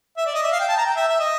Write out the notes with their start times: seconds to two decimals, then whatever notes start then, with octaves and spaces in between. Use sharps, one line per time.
0.17 E5
0.26 D5
0.34 D#5
0.43 E5
0.52 F5
0.60 G5
0.69 A5
0.77 A#5
0.85 G5
0.96 E5
1.09 E5
1.20 D#5